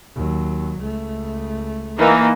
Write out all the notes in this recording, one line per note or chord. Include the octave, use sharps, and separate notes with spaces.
D#2 F#3
C#2 A3
E3 A#3 D#4